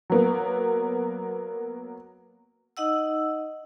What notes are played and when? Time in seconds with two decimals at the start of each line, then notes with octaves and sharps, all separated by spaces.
0.10 F#3 A#3 B3
2.77 D#4 D#5 F#5 E6